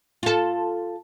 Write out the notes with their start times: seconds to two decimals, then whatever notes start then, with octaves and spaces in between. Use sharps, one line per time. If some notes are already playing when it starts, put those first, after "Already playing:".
0.23 F4 A4